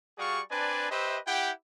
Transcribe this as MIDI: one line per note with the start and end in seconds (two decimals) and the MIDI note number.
0.18 0.41 55
0.18 0.41 66
0.18 0.41 68
0.18 0.41 74
0.18 0.41 77
0.18 0.41 85
0.51 0.89 60
0.51 0.89 62
0.51 0.89 71
0.51 0.89 74
0.51 0.89 80
0.51 0.89 81
0.90 1.18 67
0.90 1.18 71
0.90 1.18 72
0.90 1.18 75
0.90 1.18 76
1.27 1.51 64
1.27 1.51 67
1.27 1.51 78
1.27 1.51 79